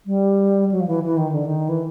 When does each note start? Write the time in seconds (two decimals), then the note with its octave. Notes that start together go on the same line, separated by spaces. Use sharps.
0.06 G3
0.71 F#3
0.80 F3
0.87 E3
1.04 E3
1.17 D#3
1.32 D3
1.45 D#3
1.69 E3